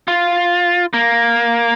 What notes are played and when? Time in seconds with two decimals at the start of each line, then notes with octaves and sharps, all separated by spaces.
0.08 F4
0.94 A#3